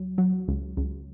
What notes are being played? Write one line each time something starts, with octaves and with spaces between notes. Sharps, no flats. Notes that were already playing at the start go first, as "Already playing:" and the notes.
Already playing: C#2 F#3
F#3
C#2
C#2